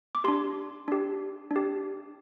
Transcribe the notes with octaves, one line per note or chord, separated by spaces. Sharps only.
D6
D4 G4 C6
D4 G4
D4
G4